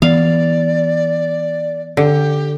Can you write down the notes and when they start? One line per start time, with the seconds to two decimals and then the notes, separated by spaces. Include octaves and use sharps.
0.02 E3 B3 D5 F5
1.97 D3 G4